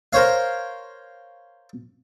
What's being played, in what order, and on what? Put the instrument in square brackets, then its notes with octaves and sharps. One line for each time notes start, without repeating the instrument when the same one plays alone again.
[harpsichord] A#4 C5 C#5 F5